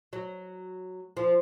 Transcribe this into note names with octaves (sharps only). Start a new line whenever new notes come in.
F#3
F3